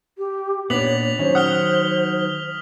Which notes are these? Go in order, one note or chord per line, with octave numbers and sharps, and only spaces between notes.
G4
A#2 B3 D4 C#5 B6 F7 F#7
D#3 F#3 C#4 C5
F#5 D#6 F6 G7